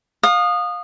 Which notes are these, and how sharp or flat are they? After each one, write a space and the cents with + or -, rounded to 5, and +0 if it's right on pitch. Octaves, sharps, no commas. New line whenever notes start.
F5 +25 D#6 -20